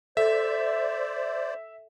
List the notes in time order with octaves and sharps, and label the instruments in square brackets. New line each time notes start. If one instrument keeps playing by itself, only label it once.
[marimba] A4 [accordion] C5 D5 [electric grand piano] E5